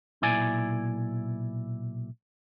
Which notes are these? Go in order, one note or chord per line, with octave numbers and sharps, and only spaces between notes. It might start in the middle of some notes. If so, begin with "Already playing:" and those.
B1 A#2 E4 D5 G#5